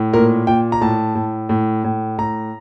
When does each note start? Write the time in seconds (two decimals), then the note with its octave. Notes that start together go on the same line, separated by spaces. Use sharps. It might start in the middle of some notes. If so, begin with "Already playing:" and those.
Already playing: A2
0.13 A#2 A#4
0.47 A#2 G5
0.72 A#5
0.81 A2 A5
1.15 A2
1.49 A2
1.84 A2
2.18 A2 A#5